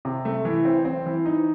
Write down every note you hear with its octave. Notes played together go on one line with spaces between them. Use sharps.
C3
A3
E3
C4
C4
E3
D#4